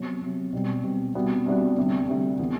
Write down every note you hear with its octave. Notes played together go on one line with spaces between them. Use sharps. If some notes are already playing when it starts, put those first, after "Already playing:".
Already playing: C3 F#3 B3
C3 F#3 B3
B2 G3 C4
B2 G3 C4
C3 G3 B3 D4 F#4
C3 G3 B3 D4 F#4
D2 C3 G3
D2 C3 G3
C3 E3 B3